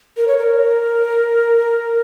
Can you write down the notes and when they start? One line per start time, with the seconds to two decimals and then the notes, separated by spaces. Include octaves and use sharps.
0.17 A#4
0.28 C#5
0.38 A#4